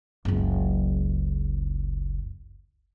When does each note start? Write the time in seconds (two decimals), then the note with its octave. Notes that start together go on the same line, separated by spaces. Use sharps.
0.25 F#1 C#2